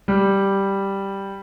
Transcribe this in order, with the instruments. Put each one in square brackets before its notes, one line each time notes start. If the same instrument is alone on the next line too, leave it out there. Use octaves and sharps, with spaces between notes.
[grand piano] G3